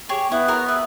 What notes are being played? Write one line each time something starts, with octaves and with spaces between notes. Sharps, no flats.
G4 G#4 C#5
B3 E4
F#4 A#4 C#5
B4 E5